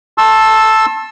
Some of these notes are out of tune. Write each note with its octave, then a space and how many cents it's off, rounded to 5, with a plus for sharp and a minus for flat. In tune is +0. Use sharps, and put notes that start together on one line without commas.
A5 +0 C6 +40 E6 +0